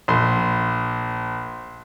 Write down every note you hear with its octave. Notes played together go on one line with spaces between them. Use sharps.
A#1 C6